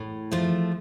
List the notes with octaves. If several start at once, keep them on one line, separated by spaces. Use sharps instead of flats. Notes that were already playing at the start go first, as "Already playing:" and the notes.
Already playing: A2
F3 A3